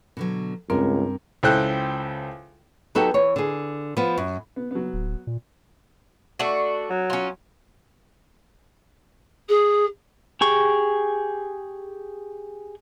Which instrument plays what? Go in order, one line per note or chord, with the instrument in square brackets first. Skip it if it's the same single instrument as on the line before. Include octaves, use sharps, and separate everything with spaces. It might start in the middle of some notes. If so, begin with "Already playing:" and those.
[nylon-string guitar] B2 D3 F#3
[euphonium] C#2 [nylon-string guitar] G2 [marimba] C4 [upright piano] A#4
[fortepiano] C#2 E4 A4 C5 G5 F#6
[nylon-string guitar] F#3 B3 D#4 F#4 G4 A4
E3 C#5
D3 G#4
F3 B3
F#2
[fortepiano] B3
F#3 B3
[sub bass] D1
A#2
[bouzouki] A3 D4 F#4
[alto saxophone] F#3
[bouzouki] C#4 F4
[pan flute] G#4
[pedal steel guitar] G4 G#4 C#6